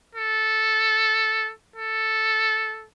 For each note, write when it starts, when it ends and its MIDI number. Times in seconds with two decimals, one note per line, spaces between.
0.15 1.52 69
1.76 2.87 69